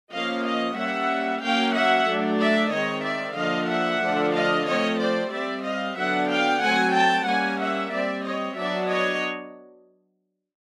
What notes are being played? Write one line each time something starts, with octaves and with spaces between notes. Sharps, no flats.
F3 A#3 C#4 D#5 F5
D#5 F5
G3 A#3 C#4 E5 F#5
F#3 A#3 C#4 F5 G5
E5 F#5
F#3 A3 D4
D5 E5
D#3 G#3 C4 C#5 D#5
D5 E5
D3 F3 A#3 D4 D#5 F5
E5 F#5
D3 F3 A3 D4
D#5 F5
F3 A3 C4 C#5 D#5
C5 D5
G3 C4 D5 E5
D#5 F5
D3 F#3 B3 D4 E5 F#5
F5 G5
F#3 A3 C4 F#5 G#5
G5 A5
G3 A#3 C#4 F#5 G#5
E5 F#5
G3 C4 D5 E5
C#5 D#5
F#3 B3 D4 D5 E5
C#5 D#5